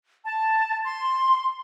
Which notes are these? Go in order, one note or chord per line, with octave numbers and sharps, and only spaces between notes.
A5
C6